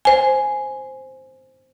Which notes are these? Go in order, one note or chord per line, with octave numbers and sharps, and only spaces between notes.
C5 G#5